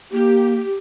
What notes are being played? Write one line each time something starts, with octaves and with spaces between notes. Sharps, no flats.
A#3 G4